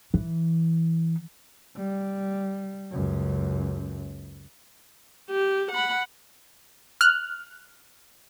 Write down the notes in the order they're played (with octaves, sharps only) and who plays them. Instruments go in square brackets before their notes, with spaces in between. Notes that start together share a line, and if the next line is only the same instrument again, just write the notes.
[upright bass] E3
[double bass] G3
C#2 F#2
[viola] G4
F#5 B5
[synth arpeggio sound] F6 F#6